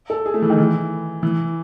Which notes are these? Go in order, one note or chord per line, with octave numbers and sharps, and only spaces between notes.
A4
G#4
A3
E3
D#3
E3
E3